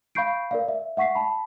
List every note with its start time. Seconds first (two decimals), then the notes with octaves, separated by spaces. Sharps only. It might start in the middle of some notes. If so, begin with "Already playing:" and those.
0.15 F5 B5 C#6 G6 C7 D7
0.51 A#4 D5 F5
0.68 E5
0.97 E5 F#5 C#6 B6 C7
1.15 A5 B5